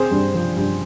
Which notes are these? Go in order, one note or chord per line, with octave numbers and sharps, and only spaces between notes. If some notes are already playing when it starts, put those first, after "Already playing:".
Already playing: C4 G#4 C5
G2
F3
G2